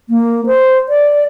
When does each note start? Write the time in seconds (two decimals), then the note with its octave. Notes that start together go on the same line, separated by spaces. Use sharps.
0.10 A#3
0.46 C5
0.89 D5